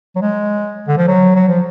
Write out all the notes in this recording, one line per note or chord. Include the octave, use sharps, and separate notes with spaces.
F#3
G#3
D3
F3
F#3
F#3
F3